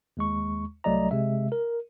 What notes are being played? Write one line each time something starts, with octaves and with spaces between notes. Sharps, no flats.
D#2 G#3 C#6
C2 F#3 A3 D5 D#5 A#5
C3 G#3 E5
A#4